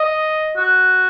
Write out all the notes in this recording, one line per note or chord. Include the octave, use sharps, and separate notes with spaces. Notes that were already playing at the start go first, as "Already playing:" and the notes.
Already playing: D#5
F#4